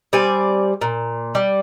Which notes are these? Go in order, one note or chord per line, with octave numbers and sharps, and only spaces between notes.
G3 C4 D5 G#5
A#2
G3